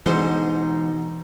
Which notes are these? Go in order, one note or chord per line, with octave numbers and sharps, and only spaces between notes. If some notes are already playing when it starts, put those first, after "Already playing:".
B2 D3 E3 G#3 D#4 G#4 C5 C6